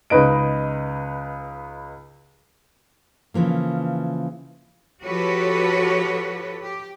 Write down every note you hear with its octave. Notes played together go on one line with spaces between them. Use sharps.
C#2 D#4 B4 D#5 D7
C#3 E3 F3 A#3
F3 F#4 G4 A4 B4 C#5
G4